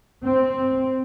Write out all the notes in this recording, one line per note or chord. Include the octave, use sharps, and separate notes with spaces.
C4